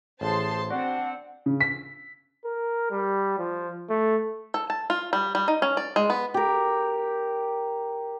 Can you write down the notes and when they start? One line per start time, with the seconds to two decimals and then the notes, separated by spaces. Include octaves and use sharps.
0.21 A1 G#4 C5 A5 C6
0.70 C4 D4 F#4 F#5
1.46 C#3
1.61 B6
2.45 A#4
2.91 G3
3.38 F3
3.89 A3
4.54 A4
4.70 A5
4.90 F4
5.13 G3
5.35 G3
5.48 D#4
5.62 C#4
5.77 D5
5.96 G#3
6.10 B3
6.34 G4 A#4